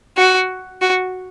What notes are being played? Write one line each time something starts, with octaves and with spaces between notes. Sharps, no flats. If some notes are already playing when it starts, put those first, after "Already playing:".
F#4
F#4